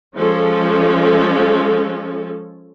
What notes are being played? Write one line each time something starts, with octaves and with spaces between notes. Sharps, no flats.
F3 G#3 C#4 A4